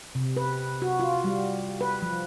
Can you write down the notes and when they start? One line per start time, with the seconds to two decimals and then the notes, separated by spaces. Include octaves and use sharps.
0.15 C3
0.37 B4
0.82 F#4
1.00 F4
1.24 G3
1.81 B4
2.02 F3